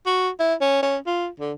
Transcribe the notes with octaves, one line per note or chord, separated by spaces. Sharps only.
F#4
E4
C#4
C#4
F4
D3